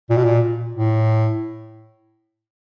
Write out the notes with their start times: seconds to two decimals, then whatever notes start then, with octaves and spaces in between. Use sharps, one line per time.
0.10 A#2
0.17 B2
0.24 A#2
0.74 A2